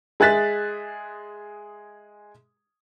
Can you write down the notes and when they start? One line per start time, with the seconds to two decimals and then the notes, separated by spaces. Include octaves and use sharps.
0.20 G#3 G#4 E5 F#6 A6 B6